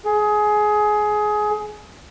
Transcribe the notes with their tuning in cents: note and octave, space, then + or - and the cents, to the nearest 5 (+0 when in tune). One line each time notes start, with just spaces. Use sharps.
G#4 +20